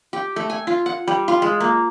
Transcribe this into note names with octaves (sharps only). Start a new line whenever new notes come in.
G4
A3
G#5
F4
F#5
G3
F4
G#3
A#3